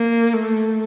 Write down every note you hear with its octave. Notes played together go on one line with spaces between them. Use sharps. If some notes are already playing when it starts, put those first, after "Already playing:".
Already playing: A#3
A3